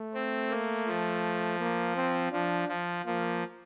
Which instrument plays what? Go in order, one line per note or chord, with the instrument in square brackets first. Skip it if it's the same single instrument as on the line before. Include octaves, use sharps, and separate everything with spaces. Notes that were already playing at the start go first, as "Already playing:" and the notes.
Already playing: [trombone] A3
[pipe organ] C4
A#3
F3
[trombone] A#3
C4
[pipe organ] F3 [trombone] D4
[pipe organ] F3
[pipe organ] F3 [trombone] A#3